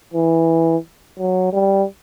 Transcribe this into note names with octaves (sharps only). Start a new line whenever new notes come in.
E3
F#3
G3